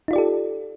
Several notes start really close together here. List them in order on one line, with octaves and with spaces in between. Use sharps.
D#4 F4 D5 G4 A4